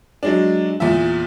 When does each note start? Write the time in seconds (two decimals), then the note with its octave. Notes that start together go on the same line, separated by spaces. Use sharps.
0.23 F#3 G#3 D4
0.80 E2 A#2 E5